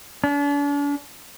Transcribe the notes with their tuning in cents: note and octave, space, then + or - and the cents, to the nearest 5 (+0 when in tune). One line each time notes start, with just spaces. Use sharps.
D4 -40